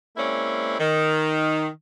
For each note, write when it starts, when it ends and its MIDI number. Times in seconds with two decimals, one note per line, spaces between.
0.17 0.76 56
0.17 0.76 58
0.17 0.76 60
0.17 0.76 61
0.17 0.76 64
0.17 0.76 74
0.79 1.66 51